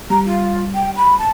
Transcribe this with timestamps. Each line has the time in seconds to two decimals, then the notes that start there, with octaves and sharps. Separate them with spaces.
0.10 G3 A#5
0.25 F4
0.75 G5
0.96 B5
1.18 A5